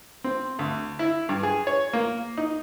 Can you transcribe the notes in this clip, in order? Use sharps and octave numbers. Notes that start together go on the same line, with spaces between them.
C4
D2
E4
G2
G#4
C#5
A#3
D#4